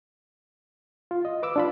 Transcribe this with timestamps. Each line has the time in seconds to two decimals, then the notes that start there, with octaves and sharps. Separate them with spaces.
1.11 F4
1.25 D#5
1.43 B4 D6 E6
1.56 D4 F4 B5